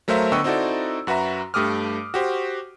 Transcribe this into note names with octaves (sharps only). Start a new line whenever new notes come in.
F#3 A3 A#4 C5 E5 F5
D3 B3 D#5 G5 C#6 E6
C4 D#4 E4 F#4 A4 D5
F#2 F#4 B4 E5 A#5
G2 A3 G4 D6 D#6 F6
F#4 G4 C5